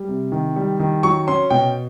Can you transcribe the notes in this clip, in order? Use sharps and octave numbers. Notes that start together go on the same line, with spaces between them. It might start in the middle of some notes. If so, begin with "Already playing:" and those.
Already playing: G3
C3
D#3
G3
D#3
F#3 C#6
C#4 C6
B2 G5